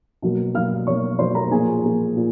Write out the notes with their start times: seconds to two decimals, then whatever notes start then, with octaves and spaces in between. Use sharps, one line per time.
0.22 B2 F#3 A#3
0.54 B2 F#3 A#3 F5 F6
0.87 B2 F#3 A#3 C#5 C#6
1.19 B2 F#3 A#3 C5 C6
1.35 A#4 A#5
1.51 A#2 F3 A#3 G#4 G#5
1.84 A#2 F3 A#3
2.16 A#2